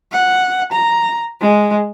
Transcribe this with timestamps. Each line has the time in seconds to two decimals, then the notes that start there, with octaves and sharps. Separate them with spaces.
0.12 F#5
0.72 A#5
1.41 G#3